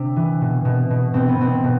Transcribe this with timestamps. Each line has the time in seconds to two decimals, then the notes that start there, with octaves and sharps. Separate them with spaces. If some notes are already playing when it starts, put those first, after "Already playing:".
Already playing: C3 D4
0.16 E3
0.41 B2
0.65 B2
0.90 B2
1.14 B2 C4
1.29 B3
1.39 B2 C4
1.64 B2